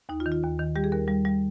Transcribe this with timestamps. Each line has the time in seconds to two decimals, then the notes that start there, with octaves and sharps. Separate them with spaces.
0.09 D#2 D#4
0.20 F4
0.26 D#3
0.32 F4
0.43 D#2
0.59 D#3
0.76 G3 G4
0.84 G#4
0.92 D#2 A#4
1.08 G3
1.25 G3